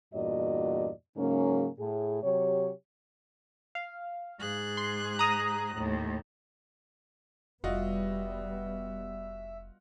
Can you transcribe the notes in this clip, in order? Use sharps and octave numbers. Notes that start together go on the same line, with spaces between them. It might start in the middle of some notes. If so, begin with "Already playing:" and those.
E2 G2 A#2 F#4 D5 D#5
G#2 C#3 F#3 A#3 C#4
A2 G#4
C3 F#3 G4 C#5
F5
G#2 G#4 F#6
C6
A#5 D#6
D#2 A2
F1 G3 B3 F4 F#4 D#5 E5